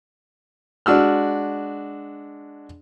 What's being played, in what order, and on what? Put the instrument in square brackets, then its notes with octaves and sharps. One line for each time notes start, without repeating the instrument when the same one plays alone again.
[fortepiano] G#3 D4 F#4 E6 F6